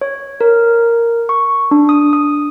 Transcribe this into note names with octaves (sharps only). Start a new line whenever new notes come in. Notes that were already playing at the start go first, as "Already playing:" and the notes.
C#5
A#4
C#6
D4
D#6
D#6